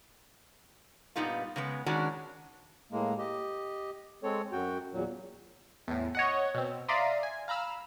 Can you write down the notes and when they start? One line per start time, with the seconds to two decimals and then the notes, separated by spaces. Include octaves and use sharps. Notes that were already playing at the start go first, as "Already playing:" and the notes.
1.16 G2 A#2 G3 B3 D#4 F4
1.56 C#3 G#3 B3
1.86 D#3 G#3 C#4 D4 F#4
2.92 A2 G#3 A#3
3.18 G4 D#5
4.23 G#3 C4 A4 C#5
4.52 F#2 F#4 G5
4.93 E2 A#2 F#3
5.88 E2 A2
6.15 C#5 D#5 F#5
6.54 B2 C4
6.88 D5 E5 F5 A#5 C6 D#6
7.23 G#5
7.48 F5 A#5 B5 E6 F6